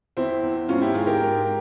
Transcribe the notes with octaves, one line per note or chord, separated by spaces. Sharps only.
E2 C4 E4
E2
G#2 C#4 F4
E4 G4
G#2 F4 G#4
G4 A#4
G#2